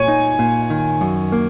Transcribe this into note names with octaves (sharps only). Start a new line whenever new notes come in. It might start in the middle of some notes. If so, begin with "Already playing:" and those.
Already playing: A#2 C#5 G#5
D#4
A#2
D#3
F#2
A#3